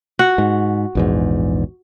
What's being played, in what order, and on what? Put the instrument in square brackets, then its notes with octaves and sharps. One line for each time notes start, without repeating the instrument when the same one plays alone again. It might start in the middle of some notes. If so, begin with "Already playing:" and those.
[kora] F#4 F#5
[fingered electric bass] G#2
A#1 E2 G#2